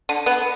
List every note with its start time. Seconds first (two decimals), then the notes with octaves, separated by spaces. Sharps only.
0.09 D3
0.26 B3